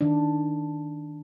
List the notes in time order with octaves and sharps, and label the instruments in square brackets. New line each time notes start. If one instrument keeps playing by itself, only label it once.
[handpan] D#3 D4